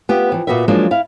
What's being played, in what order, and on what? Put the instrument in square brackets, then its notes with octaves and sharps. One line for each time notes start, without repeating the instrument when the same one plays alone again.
[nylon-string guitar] B3 F4 G4
E3 F3
A#2 A#3 B3 F#4 B4 E5
F3 F#3 G#3 A#3 D4 D#4
E4 F5